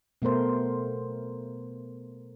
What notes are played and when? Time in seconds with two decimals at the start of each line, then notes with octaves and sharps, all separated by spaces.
0.22 B2 A3 B3 A#4 C5